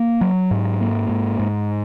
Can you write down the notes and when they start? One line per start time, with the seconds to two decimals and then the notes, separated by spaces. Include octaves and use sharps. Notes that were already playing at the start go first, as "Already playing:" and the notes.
Already playing: A#3
0.21 F#3
0.51 G#2
0.80 A#3
1.09 G#2
1.39 G#2